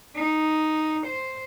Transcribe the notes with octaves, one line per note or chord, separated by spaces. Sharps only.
D#4
C5